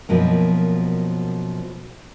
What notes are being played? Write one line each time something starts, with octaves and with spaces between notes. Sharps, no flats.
F#2 B2 F3 A#3